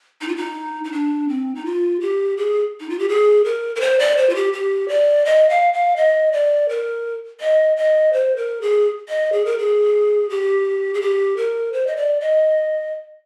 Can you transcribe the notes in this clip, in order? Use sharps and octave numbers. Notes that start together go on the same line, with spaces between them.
D#4
F4
D#4
D#4
D4
C4
D#4
F4
G4
G#4
D#4
F4
G4
G#4
A#4
A#4
C5
D5
C5
F4
G4
G4
D5
D#5
F5
F5
D#5
D5
A#4
D#5
D#5
C5
A#4
G#4
D#5
G#4
A#4
G#4
G4
G#4
G4
A#4
C5
D#5
D5
D#5